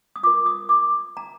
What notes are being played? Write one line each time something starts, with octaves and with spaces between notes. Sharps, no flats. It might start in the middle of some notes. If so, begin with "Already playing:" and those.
D#6
F4 A#4 D6
D#6
D6
A#5